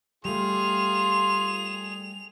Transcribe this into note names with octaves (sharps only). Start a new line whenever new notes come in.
G3 A3 F4 G#4 C6 F7